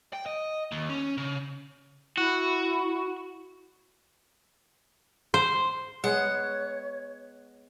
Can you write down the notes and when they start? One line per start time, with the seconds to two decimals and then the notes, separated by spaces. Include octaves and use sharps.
0.13 G5
0.26 D#5
0.72 D#2
0.89 C#4
1.18 C#3
2.18 E4 F#4
5.34 C5
6.04 G#3 B3 C#5 F#5